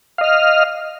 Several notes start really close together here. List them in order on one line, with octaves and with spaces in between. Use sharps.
F5 D#5 F6